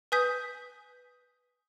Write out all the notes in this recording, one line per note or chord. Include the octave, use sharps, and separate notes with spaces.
B4 G#5 D#6 G6 B6